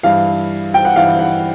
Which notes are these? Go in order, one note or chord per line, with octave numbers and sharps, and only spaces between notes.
G2 E3 F5
G5
F#5
G2 E3 F5
F#5